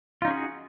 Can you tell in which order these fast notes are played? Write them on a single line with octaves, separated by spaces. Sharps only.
F4 D#4 C#4 G#4 F#4